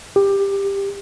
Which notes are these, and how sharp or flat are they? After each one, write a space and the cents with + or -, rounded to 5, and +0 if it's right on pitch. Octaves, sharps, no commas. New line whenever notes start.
G4 +15